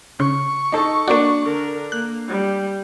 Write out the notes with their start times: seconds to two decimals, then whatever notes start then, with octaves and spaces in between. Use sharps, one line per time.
0.20 C#3 C#6
0.72 D#4 A4
1.08 A#3 D4 F#4 D5
1.44 D3 A#4
1.92 A#3 F#6
2.28 G3